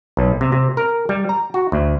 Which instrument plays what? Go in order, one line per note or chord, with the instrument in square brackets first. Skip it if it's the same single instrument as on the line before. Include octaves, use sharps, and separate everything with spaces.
[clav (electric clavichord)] B1
C3
C3
A#4
G3
A#5
F#4
D2